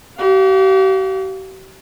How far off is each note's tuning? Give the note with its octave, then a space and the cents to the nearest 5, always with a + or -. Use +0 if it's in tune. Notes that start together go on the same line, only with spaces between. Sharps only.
G4 -45 F5 +0